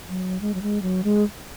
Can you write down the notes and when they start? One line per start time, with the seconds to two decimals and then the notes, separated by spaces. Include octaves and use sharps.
0.09 F#3
0.41 G#3
0.54 F#3
0.62 G#3
0.82 F#3
1.04 G#3